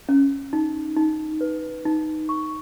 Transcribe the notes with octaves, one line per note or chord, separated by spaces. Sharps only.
C#4
D#4
D#4
B4
D#4
C#6